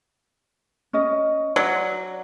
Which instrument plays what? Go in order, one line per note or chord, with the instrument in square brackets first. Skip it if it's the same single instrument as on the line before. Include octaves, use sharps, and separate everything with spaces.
[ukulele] C#4 D#5
[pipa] F#3 [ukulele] D5